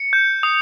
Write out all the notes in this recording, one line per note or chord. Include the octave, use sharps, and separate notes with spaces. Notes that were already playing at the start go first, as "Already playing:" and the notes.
Already playing: C#7
G6
D#6